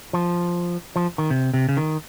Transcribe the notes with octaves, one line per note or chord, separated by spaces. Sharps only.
F3
F3
D#3
C3
C3
C#3
D#3